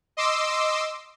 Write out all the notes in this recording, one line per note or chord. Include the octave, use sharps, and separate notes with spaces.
D#5 C6 D6 E6